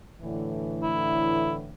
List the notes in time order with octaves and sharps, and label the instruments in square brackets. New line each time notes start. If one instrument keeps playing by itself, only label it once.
[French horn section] A2 D3 E3
[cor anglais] E4